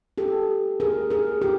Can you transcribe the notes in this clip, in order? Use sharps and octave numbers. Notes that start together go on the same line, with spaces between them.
G4 A4
G#4 A#4
G#4 A#4
G4 A4